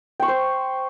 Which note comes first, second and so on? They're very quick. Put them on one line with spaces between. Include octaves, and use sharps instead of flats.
G5 C#6 C6 C5